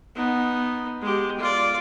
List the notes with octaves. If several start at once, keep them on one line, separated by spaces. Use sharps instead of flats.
B3 D#4
G#3 G4
F4 D5